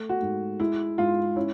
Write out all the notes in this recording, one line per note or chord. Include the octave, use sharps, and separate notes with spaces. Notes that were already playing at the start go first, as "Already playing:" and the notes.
Already playing: A3
F#4
G#2
G#3 E4
G#2 F4
C#4 E4